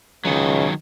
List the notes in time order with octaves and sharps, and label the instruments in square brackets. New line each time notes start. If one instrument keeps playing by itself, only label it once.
[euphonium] C#2 [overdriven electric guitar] D#3 F#3